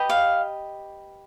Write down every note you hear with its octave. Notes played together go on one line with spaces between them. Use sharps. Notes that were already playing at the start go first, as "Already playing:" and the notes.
Already playing: G4 B4 D#5
F5